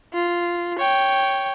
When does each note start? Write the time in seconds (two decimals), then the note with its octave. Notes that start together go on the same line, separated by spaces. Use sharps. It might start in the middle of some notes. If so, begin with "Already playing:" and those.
0.14 F4
0.79 C#5 G5